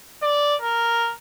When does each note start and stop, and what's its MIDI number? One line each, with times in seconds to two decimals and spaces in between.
0.22 0.55 74
0.61 1.13 70